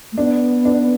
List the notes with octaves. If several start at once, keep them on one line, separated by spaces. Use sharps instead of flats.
A3
B3 D4
D4